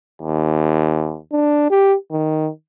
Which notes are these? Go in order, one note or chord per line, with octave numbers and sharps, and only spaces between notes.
D#2
D4
G4
D#3